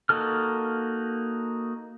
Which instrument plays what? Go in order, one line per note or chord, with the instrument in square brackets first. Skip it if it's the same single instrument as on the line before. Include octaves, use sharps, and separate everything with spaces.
[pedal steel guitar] A#3 D#4 F#4 A4 F6